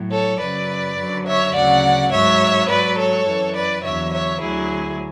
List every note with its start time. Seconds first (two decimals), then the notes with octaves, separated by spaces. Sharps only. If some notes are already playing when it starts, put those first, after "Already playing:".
Already playing: A2 F#3
0.11 A4 C#5
0.40 F#2 C#3 F#3 B4 D5
0.97 F#2 D3 F#3
1.26 C#5 E5
1.54 D2 C#3 F#3 D5 F#5
2.11 G#2 F#3 C#5 E5
2.69 G#2 F#3 B4 D5
2.98 A4 C#5
3.26 F#2 E3
3.55 B4 D5
3.84 E2 D3 F#3 C#5 E5
4.12 C#5 E5
4.41 D2 D3 F#3 E4 G#4